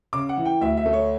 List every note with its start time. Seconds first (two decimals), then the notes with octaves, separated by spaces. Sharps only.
0.13 C#3 D6
0.29 F#5
0.38 E3
0.45 G5
0.61 D2 E5
0.77 E5
0.86 A3
0.93 C#5